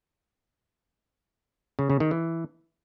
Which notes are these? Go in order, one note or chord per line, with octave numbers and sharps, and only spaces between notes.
C#3
C#3
D#3
E3